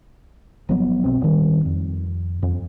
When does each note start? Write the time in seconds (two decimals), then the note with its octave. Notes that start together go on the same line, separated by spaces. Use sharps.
0.69 G1 F3 F#3 B3
1.04 B1 B2 C4
1.21 D#1 G#1 D#3 G3
1.65 F2
2.43 F2